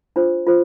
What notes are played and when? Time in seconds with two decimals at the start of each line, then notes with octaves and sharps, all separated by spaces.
0.16 D4 F4 C5
0.47 F4 C5